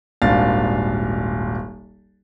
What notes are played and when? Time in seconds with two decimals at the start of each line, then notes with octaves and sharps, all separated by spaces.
0.22 D#1 G#1 D4 F5 A6